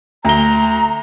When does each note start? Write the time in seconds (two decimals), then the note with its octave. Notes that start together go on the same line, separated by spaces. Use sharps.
0.25 D2 A#5 G7